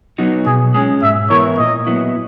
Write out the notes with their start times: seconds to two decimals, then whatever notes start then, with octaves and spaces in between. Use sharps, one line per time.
0.18 F#3 B3 D#4 F#4
0.46 B2 G#4
0.74 G#3 C#4 G#4
1.02 G#2 E5
1.30 E3 B3 E4 A#4 C#5
1.58 A#2 D#5
1.87 F#3 B3 E4